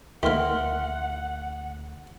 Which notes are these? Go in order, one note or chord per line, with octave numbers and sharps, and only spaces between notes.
D2 D#3 A#3 E5 F#5 C6 F6